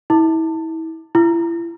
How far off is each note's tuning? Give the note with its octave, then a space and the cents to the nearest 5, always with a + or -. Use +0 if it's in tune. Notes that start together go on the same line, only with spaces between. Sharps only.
E4 -35
E4 +35